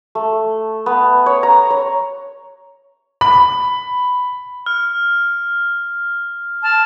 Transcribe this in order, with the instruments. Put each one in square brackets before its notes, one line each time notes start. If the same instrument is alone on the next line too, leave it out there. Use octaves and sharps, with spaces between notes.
[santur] A3
B3
C#5
A#5
C#5
[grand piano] B5
[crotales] F6
[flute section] A5 F6